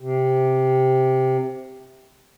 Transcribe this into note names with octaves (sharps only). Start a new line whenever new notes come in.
C3